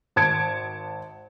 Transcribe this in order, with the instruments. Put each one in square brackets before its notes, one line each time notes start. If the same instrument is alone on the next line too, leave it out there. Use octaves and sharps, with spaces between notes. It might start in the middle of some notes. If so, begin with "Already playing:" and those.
[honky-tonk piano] G#1 A5 G#6 C#7 D7